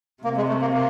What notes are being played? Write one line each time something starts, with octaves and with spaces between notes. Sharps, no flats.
C3 A#3
G#3
A3
A#3
A#3